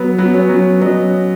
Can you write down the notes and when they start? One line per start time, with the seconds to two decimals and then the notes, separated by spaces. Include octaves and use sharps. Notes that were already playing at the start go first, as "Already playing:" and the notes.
Already playing: F#3 B3 B4
0.18 F#3 B3
0.34 C#4
0.49 F#3
0.81 F#3 D#5